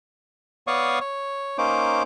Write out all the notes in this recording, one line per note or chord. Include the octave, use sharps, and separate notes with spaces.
B3 C#5 D5 F5 C#6 D#6
C#5
A#3 C#4 D#4 C5 D6